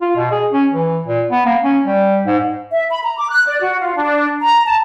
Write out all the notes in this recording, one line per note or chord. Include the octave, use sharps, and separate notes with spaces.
F4
B2
G#4
C#4
E3
A#2
B3
A#3
C#4
G3
G#2
E5
B5
A#5
D6
F#6
D5
F#4
F4
D4
A#5
A5